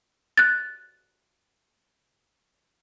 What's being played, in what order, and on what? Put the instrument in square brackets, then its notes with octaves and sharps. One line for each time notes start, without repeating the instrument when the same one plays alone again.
[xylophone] F#6 A6